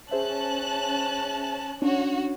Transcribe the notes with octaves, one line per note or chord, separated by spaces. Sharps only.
C#4 G#4 C5 E5 A5 F#6
C#4 D4 F#4 C#5